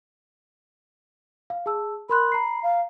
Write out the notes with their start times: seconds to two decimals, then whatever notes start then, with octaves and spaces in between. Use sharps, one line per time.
1.50 F5
1.66 G#4 A5 E6
2.09 A#4 B5 C6 F#6
2.32 A#5 C7
2.63 F5